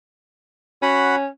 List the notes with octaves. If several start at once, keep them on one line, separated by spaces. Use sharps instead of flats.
C#4 F#4 F#5 B5